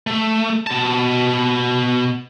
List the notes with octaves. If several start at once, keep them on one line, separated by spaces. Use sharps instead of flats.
A3
B2 A5